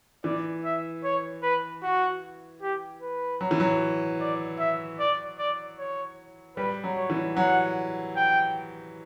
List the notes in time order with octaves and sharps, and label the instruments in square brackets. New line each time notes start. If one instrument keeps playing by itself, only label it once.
[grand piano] E3 [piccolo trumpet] D5
[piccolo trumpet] E5
C#5
B4
F#4
G4
B4
[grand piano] F#3
E3
F#3
[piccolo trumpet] D5
E5
D5
D5
C#5
[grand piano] G3 [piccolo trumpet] B4
[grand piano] F#3
[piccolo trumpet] C#5
[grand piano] E3
[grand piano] F#3 [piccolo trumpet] F#5
[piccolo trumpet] G5